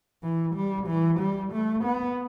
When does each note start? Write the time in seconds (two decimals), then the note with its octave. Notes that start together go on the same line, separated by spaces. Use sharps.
0.23 E3
0.56 G3
0.87 E3
1.19 G3
1.53 A3
1.84 B3